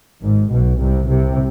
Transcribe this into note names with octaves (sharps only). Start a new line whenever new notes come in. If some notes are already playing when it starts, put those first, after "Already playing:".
G#1 G#2
B1 B2
C2 C3
C2 C3